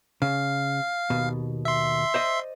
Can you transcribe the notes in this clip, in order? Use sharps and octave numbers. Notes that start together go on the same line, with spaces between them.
C#3 F5
D#2 B2
E5 C6
C5 D5 D#5